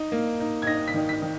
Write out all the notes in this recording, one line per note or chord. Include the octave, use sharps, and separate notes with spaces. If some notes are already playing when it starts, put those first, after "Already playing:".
Already playing: D#4
A#3
D#4
G#6
D#4 A#6
B6
D#3
B6
D#3